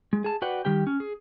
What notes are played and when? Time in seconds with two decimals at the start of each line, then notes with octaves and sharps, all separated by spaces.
0.13 G#3
0.24 G#4 A5
0.42 F#4 B4 D5 F#5 G5
0.65 D#3 G3 G4 G5
0.87 C#4
1.00 G#4